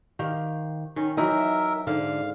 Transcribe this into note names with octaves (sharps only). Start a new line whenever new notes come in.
D#3 G4 C5 F5
D#3 C#4
E3 F#3 D#4 A#4 D#5 E5
G#2 D3 D5 F5